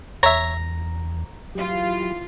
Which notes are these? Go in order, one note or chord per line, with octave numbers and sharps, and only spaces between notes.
E2 C#5 E5 A#5
E3 F#3 F4 G4